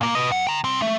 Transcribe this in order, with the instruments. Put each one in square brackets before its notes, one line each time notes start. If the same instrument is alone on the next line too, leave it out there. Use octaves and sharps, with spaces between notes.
[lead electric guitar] A#2 A#3
B4 D#5
F#2 F#5
G5 A#5
C2 C4
A3